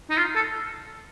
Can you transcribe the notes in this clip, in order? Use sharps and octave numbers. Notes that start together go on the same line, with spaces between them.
D#4
F4
A4